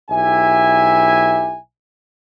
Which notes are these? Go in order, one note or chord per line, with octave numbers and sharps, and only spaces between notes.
B1 E4 G4 E5 G#5